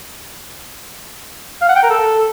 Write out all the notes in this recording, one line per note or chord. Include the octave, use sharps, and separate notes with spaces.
F5
F#5
G5
A#4
A4